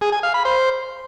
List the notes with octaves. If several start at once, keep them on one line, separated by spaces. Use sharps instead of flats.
G#4
G#5
F5
B5
C5